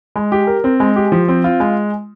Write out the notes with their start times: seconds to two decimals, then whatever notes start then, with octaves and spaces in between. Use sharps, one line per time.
0.16 G#3
0.32 G4
0.47 A#4
0.64 C4
0.80 G#3
0.96 G4
1.12 F3
1.28 C4
1.44 F4
1.60 G#3